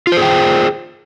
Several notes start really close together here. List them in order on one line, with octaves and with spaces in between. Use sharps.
F4 C5 G#4 G5